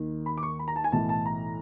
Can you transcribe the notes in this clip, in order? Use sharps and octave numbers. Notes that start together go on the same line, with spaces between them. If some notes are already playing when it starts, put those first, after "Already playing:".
Already playing: D#2 D#3
B5
D6
C#6
B5
A#5
A5
G#5
B1 A2 E3 A5
A5
A#5